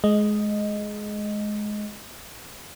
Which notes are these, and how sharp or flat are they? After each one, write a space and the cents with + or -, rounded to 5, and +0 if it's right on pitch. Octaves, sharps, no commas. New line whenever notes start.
G#3 +20 D#5 +0